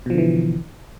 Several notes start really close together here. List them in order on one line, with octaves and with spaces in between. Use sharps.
B2 F3 D3 E3